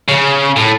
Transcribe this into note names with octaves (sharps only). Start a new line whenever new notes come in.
C#3
A2